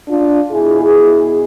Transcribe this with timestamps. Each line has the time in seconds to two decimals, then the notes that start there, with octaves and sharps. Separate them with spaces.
0.09 D4 F4
0.52 B2 E4 G#4